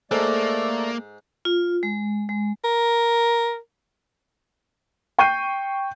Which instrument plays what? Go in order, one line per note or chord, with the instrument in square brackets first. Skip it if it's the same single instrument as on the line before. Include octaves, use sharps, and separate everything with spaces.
[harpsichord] G#2 [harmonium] A3 D5 [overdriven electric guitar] A#3 [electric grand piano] A4
[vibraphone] F4
G#3
G#3
[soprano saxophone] A#4
[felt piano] G5 C#6 G6 C7 D#7